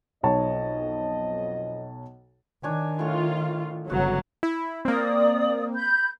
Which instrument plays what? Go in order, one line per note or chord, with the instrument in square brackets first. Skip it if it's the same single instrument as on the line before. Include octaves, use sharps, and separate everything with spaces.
[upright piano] B1 C#5 A5 [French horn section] F2 D#5
[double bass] D#3 [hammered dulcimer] D4 C#5 G#5
[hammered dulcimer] A2 C#6 [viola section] F4
[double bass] G1 C#3 [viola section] F#3 [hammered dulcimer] F#4
[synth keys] E4
[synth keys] A#3 C4 [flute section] D5 D#6
[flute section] B5 G6